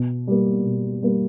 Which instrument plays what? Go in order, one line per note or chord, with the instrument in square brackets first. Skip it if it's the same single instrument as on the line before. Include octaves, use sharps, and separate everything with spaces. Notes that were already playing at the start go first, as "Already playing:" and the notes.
Already playing: [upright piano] B2
G3 A#3
B2
G3 A#3